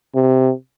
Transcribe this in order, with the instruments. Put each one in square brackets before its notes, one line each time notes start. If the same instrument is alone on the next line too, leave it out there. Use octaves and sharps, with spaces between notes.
[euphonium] C3